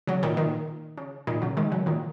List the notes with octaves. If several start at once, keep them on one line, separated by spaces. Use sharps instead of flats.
C#3 F#3
A#2 D#3
A#2 D#3
C#3
A#2 D#3
C#3 F#3
D#3 G#3
C#3 F#3
A#2 D#3